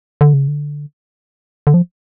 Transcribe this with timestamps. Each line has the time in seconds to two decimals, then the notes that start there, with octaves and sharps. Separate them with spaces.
0.21 D3
0.34 C#3
0.48 D3
1.67 D3
1.74 F3